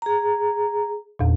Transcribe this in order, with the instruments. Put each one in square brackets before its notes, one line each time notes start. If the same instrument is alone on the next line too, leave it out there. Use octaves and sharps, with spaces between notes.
[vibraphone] G#4 A#5
[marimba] E2 A#2